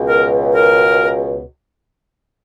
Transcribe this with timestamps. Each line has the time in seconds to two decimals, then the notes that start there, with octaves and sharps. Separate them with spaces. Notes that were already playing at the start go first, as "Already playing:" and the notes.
Already playing: C#2 B2
0.08 A#4
0.54 A#4